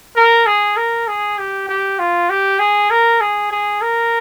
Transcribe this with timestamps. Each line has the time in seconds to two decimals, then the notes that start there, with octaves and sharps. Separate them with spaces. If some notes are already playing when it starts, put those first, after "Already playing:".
0.16 A#4
0.46 G#4
0.77 A#4
1.08 G#4
1.38 G4
1.69 G4
1.99 F4
2.30 G4
2.59 G#4
2.91 A#4
3.21 G#4
3.52 G#4
3.82 A#4